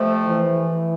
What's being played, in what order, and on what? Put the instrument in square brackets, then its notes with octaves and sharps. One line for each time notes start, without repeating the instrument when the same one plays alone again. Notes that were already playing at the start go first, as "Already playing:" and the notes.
Already playing: [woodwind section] F2 C3 F3 A3
[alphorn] E3